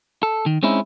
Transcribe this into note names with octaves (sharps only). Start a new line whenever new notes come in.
A4
D#3
G#3 C4 C#4 D#4 E4